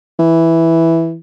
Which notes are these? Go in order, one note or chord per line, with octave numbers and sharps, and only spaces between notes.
E3